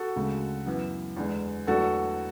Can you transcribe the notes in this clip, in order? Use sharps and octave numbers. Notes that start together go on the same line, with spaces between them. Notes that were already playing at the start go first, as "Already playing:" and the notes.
Already playing: F#4 A4
D2 C#3 G#3
F#2 E3 B3
E2 D3 G#3
E2 D3 F#3 A3 F#4 A4